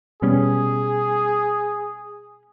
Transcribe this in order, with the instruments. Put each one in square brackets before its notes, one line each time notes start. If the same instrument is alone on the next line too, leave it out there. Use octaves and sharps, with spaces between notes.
[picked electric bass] B2 G3 C#4 [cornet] G#4